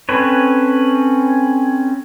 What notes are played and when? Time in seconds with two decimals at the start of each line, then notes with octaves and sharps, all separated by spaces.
0.09 C4 C#4 A4 B4 C#5